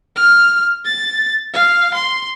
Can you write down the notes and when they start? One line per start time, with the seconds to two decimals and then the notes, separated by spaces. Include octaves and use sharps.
0.16 F6
0.85 A6
1.54 F5
1.94 C6